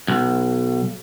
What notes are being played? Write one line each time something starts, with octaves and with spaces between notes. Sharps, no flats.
B1